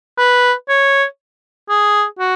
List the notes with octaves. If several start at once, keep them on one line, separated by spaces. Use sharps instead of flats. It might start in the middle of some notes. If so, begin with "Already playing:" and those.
B4
C#5
G#4
F#4